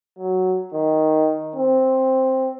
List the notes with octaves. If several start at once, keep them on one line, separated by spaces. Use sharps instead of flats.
F#3
D#3
C4